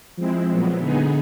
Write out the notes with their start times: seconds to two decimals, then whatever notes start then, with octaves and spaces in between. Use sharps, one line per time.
0.18 F3 G#3 C4 E4
0.50 A#2 F#3 B3
0.81 D3 B3 D#4 G#4